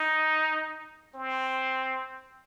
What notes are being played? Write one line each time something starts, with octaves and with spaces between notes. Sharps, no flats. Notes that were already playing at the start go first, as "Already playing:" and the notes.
Already playing: D#4
C4